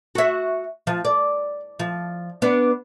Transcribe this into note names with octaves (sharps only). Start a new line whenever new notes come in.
F#4 E5
F3
D5
F3
B3 D4